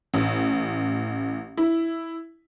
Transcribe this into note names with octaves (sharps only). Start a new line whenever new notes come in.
A1
E4